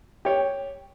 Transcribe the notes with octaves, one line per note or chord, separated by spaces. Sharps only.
G4 C#5